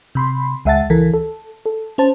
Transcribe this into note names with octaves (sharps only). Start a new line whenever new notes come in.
C3 B5 C6
C#2 G#3 E5 F#5 A5 A6
C#2 E3 A4 A#4
A4
A4
C#4 C5 A5